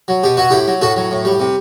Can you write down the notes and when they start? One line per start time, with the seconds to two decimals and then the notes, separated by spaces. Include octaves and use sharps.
0.08 F#3
0.24 B2 G4
0.37 F#3 F#4
0.50 A2 E4 G4
0.67 F#3
0.82 A2 F#4 A4
0.96 F#3
1.11 A2
1.25 G3
1.40 C3